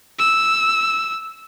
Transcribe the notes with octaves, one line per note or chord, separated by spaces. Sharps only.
E6